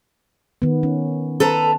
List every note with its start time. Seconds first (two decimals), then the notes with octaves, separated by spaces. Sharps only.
0.62 D#3 B3
0.83 C#4
1.40 A4 B4 A#5